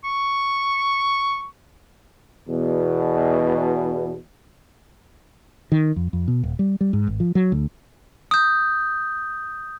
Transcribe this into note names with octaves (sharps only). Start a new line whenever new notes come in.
C#6
E2 B2
D#3
F2
F2
B2
D#1
G3
G3
G#2
G#1
F3
F#3
D2
D#6 G6